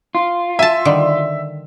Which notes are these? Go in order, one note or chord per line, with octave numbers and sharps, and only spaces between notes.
F4
E5 G#5 A5
D3 D#3 G3